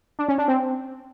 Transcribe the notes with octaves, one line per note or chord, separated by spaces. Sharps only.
D4
C#4
D4
C4